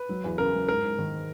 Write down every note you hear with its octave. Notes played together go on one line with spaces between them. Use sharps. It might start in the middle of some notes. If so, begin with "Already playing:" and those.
Already playing: B4
F#3
E2
C#3 A#4
F#3
G#2 A#4
G#2
D#3